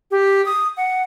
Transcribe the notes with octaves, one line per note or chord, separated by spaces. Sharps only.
G4
D#6
F#5